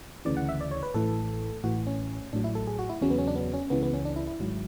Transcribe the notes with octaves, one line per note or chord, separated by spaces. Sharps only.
D2 C#3 E3 D5
F#5
E5
D5
C#5
B4
A1 A2 E3 A4
A1 A2 E3 F#4
C#4
A1 A2 F#3 D4
E4
A4
G#4
F#4
E4
E2 C#3 F#3 C#4
B3
C#4
D4
B3
C#4
C#2 C#3 E3 B3
B3
C#4
D4
E4
E4
G#1 G#2 F#3